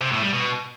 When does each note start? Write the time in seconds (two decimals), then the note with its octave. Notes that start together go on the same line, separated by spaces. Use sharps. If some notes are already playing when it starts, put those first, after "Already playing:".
0.01 C3
0.12 A2
0.22 G3
0.33 B2